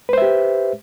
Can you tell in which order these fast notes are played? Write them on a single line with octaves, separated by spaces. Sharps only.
B4 C5 E5 G4